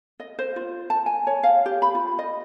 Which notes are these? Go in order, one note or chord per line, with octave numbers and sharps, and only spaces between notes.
D#5
C5
F4
A5
G#5
C#5
F5
G4
B5
F4
D#5